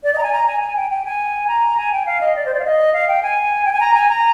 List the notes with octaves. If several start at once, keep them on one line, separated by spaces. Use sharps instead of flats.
D5
D#5
A#5
G#5
A#5
G#5
G#5
G5
G5
G#5
A#5
G#5
G5
F5
D#5
D5
C5
D5
F5
D#5
F5
G5
G#5
G5
G#5
A#5
G#5
A#5